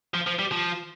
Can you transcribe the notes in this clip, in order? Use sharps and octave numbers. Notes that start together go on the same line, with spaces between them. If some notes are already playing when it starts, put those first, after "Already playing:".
F3
F3
G3
F3